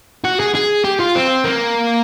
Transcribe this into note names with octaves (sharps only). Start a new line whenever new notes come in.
F#4
G#4
G#4
G4
F4
C4
A#3